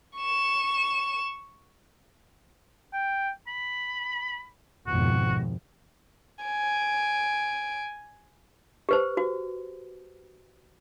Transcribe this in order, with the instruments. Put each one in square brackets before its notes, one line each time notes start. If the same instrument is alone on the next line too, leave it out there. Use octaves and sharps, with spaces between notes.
[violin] C#6 E7
[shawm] G5
B5
[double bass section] G#1 F2 B2 [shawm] F#4
[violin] G#5 D7
[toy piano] G4 B4 C5
F#4